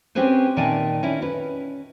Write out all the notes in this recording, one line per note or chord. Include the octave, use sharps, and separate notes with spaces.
C4 C#4 G4 G#4 B4 C5
A#2 D#3 D5 E5 G#5 A5
C#4 D#4 E4
C#4 B4